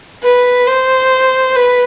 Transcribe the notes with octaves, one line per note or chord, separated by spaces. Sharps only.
B4
C5
B4